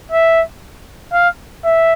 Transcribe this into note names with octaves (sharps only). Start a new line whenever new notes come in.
E5
F5
E5